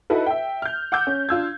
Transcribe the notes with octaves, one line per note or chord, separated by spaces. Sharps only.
D#4 E4 F#4 A4 B4
E5 G5
F6 G6
F#5 D6 E6 G6
C#4
D4 F4 E6 G#6